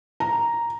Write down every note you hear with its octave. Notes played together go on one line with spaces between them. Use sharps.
A#5